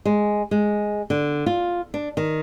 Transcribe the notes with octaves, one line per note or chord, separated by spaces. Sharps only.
G#3
G#3
D3
F4
D4
D#3